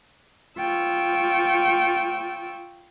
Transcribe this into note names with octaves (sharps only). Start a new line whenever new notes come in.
F4 G5 C#6 E6